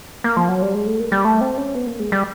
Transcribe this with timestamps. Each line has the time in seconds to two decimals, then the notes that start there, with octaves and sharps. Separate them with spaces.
0.24 A#3
0.37 F3
0.48 F#3
0.62 G3
0.74 G#3
0.86 A3
1.00 A#3
1.12 G3
1.25 A3
1.41 C4
1.58 C#4
1.75 B3
1.87 A#3
2.00 G#3
2.12 G3